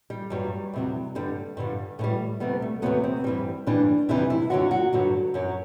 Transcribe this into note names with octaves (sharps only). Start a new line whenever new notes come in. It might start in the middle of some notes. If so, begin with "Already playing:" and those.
G3
G2 F#3 G3
E2 C3 F#3
G2 D3 G3
G2 D3 G3
A2 E3 G3 A3
D2 C3 G3 B3
A3
E2 C3 F#3 B3
C4
G2 E3 G3
G2 E3 G3 D4
E2 C3 E3 G3 E4
E4
F#2 D3 F#3 F#4
F#4
G2 D3 F#3
F#2 F#3